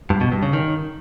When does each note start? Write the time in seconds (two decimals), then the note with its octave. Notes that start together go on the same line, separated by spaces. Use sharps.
0.10 G2
0.21 B2
0.32 G2
0.43 C#3
0.53 D#3